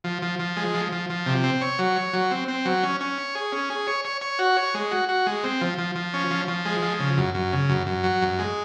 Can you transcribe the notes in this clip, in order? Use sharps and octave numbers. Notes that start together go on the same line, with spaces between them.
F3
F3
F3
G#3
F3
F3
F3
C3
C4
C#5
F#3
C#5
F#3
C4
C4
F#3
C#4
C#4
C#5
G#4
C#4
G#4
C#5
C#5
C#5
F#4
C#5
G#3
F#4
F#4
G#3
C4
F3
F3
F3
C#4
F3
F3
G#3
F3
C#3
F#2
F#2
C#3
F#2
F#2
F#3
F#2
G#3